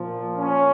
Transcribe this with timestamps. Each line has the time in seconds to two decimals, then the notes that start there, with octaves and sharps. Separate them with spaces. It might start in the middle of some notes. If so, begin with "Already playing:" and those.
Already playing: A#2 F3
0.38 C#4